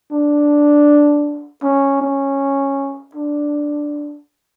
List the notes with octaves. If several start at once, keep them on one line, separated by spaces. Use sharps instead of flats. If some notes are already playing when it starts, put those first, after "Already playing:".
D4
C#4
C#4
D4